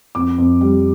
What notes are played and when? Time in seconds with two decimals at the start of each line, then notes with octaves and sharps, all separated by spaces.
0.15 F2 D6
0.38 F2
0.61 G3